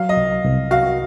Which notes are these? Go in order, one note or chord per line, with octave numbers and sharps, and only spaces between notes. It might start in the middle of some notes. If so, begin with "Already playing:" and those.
Already playing: F#3 F5
D#5
C2
C2
F#4 F5